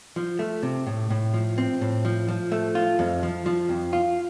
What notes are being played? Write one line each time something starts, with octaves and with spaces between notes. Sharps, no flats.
F3
A3
C3
A2
A2
F3
C4
A2
F3
F3
A3
F4
F2
F3
F3
F2
F4